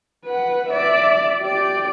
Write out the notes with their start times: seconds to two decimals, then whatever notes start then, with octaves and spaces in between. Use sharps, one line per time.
0.24 B4 F#5
0.68 D5 E5
1.41 G4 D5